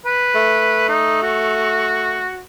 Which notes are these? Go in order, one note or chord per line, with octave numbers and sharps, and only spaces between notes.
B4
A3
D#4
F#4